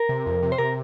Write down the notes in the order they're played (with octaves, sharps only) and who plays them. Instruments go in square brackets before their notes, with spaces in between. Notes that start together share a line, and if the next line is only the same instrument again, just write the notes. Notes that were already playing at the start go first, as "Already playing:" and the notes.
Already playing: [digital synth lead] A#4
[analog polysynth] C3
F2
C3
[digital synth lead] C5
[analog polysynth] C3 [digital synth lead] A#4